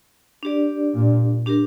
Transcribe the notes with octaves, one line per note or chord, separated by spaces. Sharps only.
D4 G4 D5
A#2
D4 G4 A#4